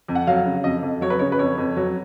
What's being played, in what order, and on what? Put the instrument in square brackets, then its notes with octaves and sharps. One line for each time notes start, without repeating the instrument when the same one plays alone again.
[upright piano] F2
F#5
F#3 F5
C#3
F2 D#5
F2
F#3 C#5
B4
C#3 C#5
B4
F2 C#5
F2
F#3